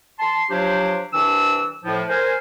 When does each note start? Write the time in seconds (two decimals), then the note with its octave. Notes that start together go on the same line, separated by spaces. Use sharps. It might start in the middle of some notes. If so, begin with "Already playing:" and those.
0.19 A5 C6
0.50 F3 F#3 D4 G4 C5 C#5
1.13 C2 E3 D4 E6
1.84 A2 F3
2.09 A#4 C5 G#5